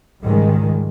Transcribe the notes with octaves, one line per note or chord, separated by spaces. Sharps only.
C#2 G#2 D#3 G3 G#3